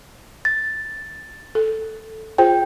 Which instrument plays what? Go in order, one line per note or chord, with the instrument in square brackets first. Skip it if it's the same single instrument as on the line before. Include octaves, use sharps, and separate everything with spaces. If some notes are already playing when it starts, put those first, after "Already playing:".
[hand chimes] A6
[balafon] A4
[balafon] F4 G#4 C5 [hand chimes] G5